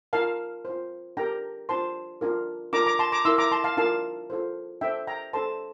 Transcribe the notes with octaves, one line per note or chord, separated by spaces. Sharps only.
F4 A#4 F5 A5
F4 C5
D4 G4 A#4 G5 A#5
D4 F4 C5 A5 C6
D4 F4 A#4
D4 F4 A#4 A#5 D6
A#5 D6
A5 C6
A#5 D6
E4 A#4 C6 E6
A#5 D6
A5 C6
F5 A5
D4 F4 A#4 F5 A5
F4 A4 C5
D4 A4 C5 E5 G5
G5 A#5
D4 A4 C5 A5 C6